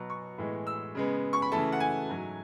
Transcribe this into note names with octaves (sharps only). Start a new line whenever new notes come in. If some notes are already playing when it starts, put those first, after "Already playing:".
Already playing: B2 F#3 B3
C#6
A2 E3 G#3 B3
E6
C#3 G#3 B3
C#6
B5
C#3 E3 A3 A5
F#5
G#5
G#2 F#3 A3